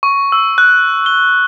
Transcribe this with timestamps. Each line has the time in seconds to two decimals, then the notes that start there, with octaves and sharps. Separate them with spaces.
0.03 C#6
0.32 E6
0.58 F#6
1.06 G7